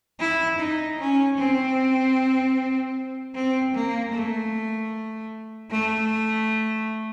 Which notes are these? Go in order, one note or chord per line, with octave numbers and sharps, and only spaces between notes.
E4
D#4
C#4
C4
C4
A#3
A3
A3